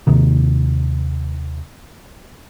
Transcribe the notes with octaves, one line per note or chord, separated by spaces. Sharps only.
D#2 C3 D#3